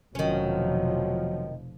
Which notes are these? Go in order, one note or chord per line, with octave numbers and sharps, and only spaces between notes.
F1 B2 D#3 F3 F#3 C#4